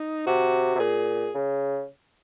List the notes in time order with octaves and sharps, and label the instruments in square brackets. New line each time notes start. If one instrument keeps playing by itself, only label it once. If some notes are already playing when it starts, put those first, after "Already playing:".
Already playing: [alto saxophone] D#4
[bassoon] C3 [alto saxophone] F#4
[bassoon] C3
[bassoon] A#2 [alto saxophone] G#4
[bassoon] C#3